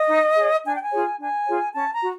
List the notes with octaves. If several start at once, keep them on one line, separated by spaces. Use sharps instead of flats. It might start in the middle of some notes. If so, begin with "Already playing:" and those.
Already playing: D#5
D#4
G#4 C#5
D4 G#5
G5
G#5
F4 G#4 C#5
D4 G#5
F4 G#4 C#5
C#4 A5
A#5
F#4